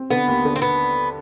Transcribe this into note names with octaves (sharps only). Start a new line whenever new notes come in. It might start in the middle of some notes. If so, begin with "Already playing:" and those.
Already playing: C4
D3 B3
D#2
D3
C4
B3